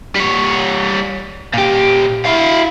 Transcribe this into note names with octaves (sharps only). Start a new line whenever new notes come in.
G3 C#5
A#2 G4
E4 F5